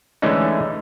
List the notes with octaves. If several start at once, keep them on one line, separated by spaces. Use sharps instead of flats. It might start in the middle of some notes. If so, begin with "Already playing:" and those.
D3 E3 G#3 A3 C#4 D#4